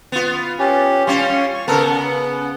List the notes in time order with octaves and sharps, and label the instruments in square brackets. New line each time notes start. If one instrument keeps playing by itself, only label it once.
[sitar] B3 F4
[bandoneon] C#4 G4
[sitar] G3 C#4 [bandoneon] F4 C#5 C6
[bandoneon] C#6
[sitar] C#3 B3 [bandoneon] A4 A#4
[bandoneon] F#5